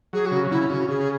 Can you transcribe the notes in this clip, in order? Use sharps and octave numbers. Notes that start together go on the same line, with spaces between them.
F#3 G#4
F#4
C#3
C#3 E4
C#3 F#4
C#3 G#4